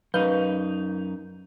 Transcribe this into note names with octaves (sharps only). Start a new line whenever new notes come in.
F#2 D#4 B4 F5 G6